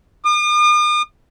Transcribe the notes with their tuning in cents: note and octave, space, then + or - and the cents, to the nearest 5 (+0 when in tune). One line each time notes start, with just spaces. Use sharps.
D#6 -45